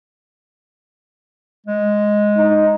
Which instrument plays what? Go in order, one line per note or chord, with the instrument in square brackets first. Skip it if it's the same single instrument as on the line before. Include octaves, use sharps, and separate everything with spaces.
[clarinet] G#3
[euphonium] D#4